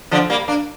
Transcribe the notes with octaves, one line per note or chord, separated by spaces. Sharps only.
D3 F3
G3 A#3
A#3 D4